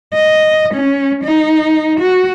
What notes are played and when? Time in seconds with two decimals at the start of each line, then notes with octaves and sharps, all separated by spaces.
0.14 D#5
0.74 C#4
1.24 D#4
2.00 F#4